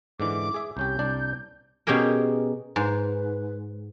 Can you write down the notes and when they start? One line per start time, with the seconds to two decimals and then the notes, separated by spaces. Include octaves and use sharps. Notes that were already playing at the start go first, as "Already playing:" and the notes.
0.20 G#2 D3 E3 D6
0.54 G#4 E5
0.77 C2 C#4 G4 G6
0.99 C2 D4 D5
1.87 B2 C#4 G4 G#4 A#4
2.76 G#2 B4